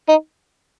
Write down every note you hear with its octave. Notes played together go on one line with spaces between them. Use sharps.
D#4